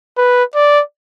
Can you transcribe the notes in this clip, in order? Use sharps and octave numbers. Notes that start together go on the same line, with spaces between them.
B4
D5